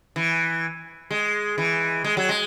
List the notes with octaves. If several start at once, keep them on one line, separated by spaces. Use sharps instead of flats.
E3
G#3
E3
G#3
F#3
G#3